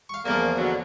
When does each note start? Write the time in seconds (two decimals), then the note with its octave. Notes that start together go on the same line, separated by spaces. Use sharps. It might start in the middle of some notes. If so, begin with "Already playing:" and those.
0.09 F5 C#6
0.26 E2 C#3 F3 A#3
0.57 B2 D3 F#3